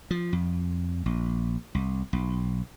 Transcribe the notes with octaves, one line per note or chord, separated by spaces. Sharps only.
F3
F2
A#1
C2
B1